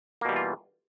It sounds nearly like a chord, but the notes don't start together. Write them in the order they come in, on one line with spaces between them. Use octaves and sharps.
A#3 B2 G3 E3 F4